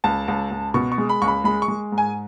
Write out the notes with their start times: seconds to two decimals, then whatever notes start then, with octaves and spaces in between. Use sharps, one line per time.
0.04 C#2 A5
0.28 C#2
0.51 C#2
0.74 B2 C#6
0.92 C#6
0.98 G#3
1.09 B5
1.22 C#2 C#6
1.28 B5
1.44 G#3 B5
1.62 C#6
1.68 G#3
1.92 G#2
1.98 G#5